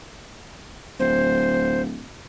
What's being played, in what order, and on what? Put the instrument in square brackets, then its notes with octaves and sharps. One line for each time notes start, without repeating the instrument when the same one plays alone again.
[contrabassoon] D1 [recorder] C5